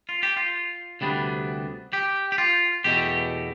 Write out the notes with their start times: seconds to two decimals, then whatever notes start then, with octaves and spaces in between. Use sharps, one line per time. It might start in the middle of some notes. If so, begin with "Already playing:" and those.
0.09 F4
0.23 G4
0.37 F4
1.01 D2 C3 G3 B3 D4
1.93 G4
2.32 G4
2.38 F4
2.84 E2 B2 A3 G4